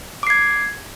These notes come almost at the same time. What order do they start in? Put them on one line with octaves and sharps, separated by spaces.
D6 C7 G#6